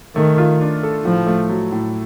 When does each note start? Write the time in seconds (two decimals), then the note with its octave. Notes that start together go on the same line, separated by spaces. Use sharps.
0.16 D#3 A3
0.38 F4
0.61 D4
0.83 A4
1.05 A2 F3
1.27 A3
1.49 F#3
1.72 A2